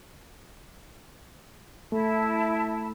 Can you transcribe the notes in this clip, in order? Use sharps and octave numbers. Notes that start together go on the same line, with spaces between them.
A3 E4 A5